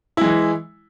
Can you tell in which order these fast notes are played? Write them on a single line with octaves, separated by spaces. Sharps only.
E4 G#3 E3